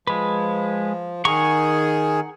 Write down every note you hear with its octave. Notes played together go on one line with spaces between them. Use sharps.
F3 G#3 B4
D#3 G#4 F#5 A#5 C#6